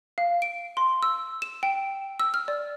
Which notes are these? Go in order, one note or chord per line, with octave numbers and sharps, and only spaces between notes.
F5
D7
C6
E6
E7
G5
E6
F6
D5